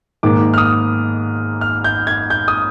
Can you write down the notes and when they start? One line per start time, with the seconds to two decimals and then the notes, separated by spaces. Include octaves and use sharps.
0.23 G#2 D#3 A#3 D6
0.54 F6
0.58 D#6
1.61 F6
1.84 G6
2.07 G#6
2.30 G6
2.48 D#6